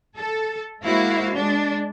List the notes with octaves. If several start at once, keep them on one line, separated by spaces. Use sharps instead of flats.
A4
G#3 A#3 E4 F#4 C5 F5
G#3 D4